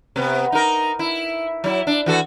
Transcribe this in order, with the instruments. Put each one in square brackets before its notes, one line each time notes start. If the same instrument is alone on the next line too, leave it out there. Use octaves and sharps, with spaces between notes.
[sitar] C3 B3
D#4 A#4
E4
F#3 E4
D4
E3 F#4 A4